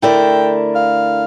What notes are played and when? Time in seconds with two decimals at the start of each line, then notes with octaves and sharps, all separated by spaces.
0.02 D3 A3 E4 A#4 D5 G5
0.75 F5